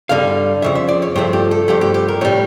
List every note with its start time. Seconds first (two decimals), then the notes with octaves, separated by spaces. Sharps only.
0.09 G2 D3 G3 F5
0.62 F2 C#3 F3 E5
0.75 E5
0.89 D5
1.02 C#5
1.16 G2 F3 A3 G4
1.33 G4
1.51 A4
1.68 G2 F3 A3 G4
1.81 G4
1.94 G4
2.08 A#4
2.21 A2 G3 C#5